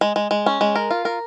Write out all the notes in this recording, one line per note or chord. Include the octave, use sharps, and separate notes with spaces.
G#3
G#3
G#3
C#4
G#3
A#4
F4
A#4